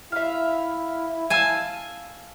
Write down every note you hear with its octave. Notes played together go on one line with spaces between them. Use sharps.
E4 E5 F5
F5 G#5 A5 E6